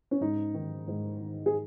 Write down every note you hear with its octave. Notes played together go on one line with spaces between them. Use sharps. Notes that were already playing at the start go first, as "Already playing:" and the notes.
C#4
G#2 D#4
D#3
G#2
D#3
G#4